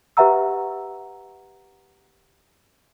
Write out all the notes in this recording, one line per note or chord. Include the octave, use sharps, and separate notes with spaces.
G4 B4 E5 F#5 A#5 E6